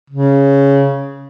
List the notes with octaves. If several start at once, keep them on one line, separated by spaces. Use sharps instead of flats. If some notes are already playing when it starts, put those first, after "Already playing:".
C#3